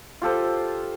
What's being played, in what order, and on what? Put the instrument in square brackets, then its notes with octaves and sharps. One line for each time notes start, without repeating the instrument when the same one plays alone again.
[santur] F4 G4 A4 C5